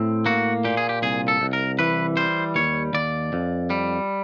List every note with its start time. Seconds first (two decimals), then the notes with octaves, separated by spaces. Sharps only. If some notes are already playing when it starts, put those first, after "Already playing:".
Already playing: A2 C4
0.26 A#3 F#4
0.65 A#2 G4
0.77 G#4
0.89 G4
1.02 C2 G#4
1.28 A4
1.41 C2
1.53 A#4
1.79 E3 B4
2.17 G3 C5
2.56 D#2 C#5
2.93 D#2 D5
3.33 F2
3.70 G3